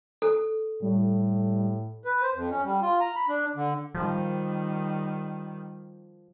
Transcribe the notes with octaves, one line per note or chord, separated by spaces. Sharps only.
A4
A2 G3
B4
C5
F2
C#4
G3
F4
A#5
B5
D4
D3
D#3 F3 G3